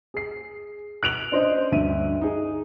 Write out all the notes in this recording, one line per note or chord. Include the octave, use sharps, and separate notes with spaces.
G#4 C7
F#6 D7 F7 F#7
C#4 D4 C5 D#5
D2 G2 E5 D#7
D#4 G#4